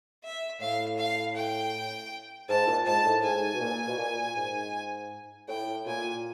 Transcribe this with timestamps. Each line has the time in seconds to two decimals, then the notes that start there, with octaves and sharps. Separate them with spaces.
0.24 E5
0.60 A2 F5
0.98 F5
1.36 G5
2.49 G#2 A5
2.67 A#2
2.86 G#2 A5
3.05 A2
3.23 G#2 G#5
3.53 B2
3.60 A#2
3.88 B2
3.98 A#2
4.36 G#2
5.48 A2 G5
5.86 A#2 G#5